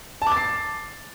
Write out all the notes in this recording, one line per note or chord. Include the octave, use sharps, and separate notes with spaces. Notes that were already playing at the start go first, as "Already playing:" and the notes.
A5
D6
A6
C7